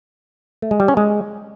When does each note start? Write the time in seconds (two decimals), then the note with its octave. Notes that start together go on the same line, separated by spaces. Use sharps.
0.62 A3
0.71 G#3
0.80 G3
0.88 C#4
0.97 G#3